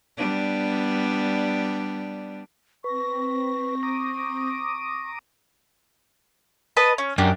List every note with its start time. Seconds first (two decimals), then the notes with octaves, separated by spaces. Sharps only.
0.17 G3 B3 D4
2.84 C4 B4 C#6 A#6
3.83 A#5 D6 D#6
6.77 B4 D#5 A5
6.98 C#4
7.18 F#2 D4 G4